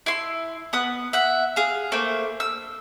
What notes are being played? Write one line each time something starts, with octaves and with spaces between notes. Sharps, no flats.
E4 C6
B3 B4 D#6
E5 F#5
G#4 F5
A3 A#3 C5
E6